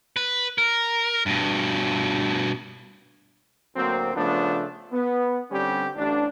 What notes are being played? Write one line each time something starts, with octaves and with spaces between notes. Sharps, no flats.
B4
A#4
G2 B2
D2 F#3 A#3 C4
C#3 F3 A3 B3 D4
B3
D3 G3 C4 C#4 G4
A1 D4